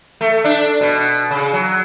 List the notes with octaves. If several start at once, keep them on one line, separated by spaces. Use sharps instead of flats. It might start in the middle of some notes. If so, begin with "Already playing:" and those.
A3
D4
B2
C#3
F#3